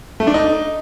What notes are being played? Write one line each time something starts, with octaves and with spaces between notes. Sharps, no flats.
A3
D4
D#4